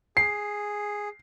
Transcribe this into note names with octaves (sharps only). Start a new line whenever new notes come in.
G#4 C7